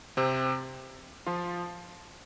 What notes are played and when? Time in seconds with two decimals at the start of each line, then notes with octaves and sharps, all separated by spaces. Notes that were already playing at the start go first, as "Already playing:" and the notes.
0.17 C3 C4
1.27 F3 F4